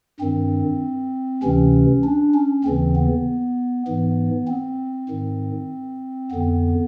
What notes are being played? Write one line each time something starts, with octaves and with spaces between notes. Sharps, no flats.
G2 D#3 C4
D2 C3 E3 C#4
D4
C#4
D#2 C#3 E3 C4
B3
G#2 E3 B3
C4
G#2 D#3
F2 D3 B3